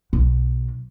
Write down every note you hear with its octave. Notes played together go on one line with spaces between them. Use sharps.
B1 B2